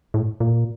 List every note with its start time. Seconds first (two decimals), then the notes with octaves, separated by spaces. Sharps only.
0.14 A2
0.40 A#2